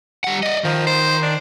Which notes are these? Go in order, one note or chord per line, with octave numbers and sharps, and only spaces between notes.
G3 F#5
D5 D#5
D#3 F3
C5
D4